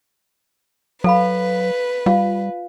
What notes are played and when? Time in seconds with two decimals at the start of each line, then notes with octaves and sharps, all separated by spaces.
1.04 F#3 A4 B4 F5 B5
2.06 G3 F4 F5